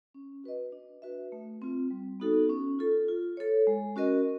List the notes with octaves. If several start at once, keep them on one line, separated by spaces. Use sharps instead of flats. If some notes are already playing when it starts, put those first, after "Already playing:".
C#4
F#4 B4 D#5
D4
F#4 B4 E5
A3
C4 F4
G3
B3 D#4 F#4 A4
C#4
F4 A4
F4
A4 C#5
G#3
C#4 F#4 A#4 D#5